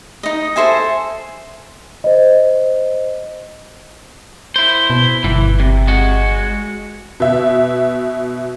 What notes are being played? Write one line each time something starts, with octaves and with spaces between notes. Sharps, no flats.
D#4 D#5
A4 C5 E5 G#5
C5 D#5
E4 C5
B2
G1 E3
C3
G#3 F#4
B2 E5